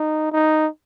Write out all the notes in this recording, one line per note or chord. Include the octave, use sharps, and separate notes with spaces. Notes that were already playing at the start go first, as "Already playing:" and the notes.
Already playing: D#4
D#4